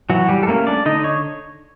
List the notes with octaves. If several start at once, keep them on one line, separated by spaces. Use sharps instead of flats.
E3 F#3 F#4
G3 G4
A4
A3 A#3 C#4 A#4
D4 D5
D3 D#4 D#5
C#5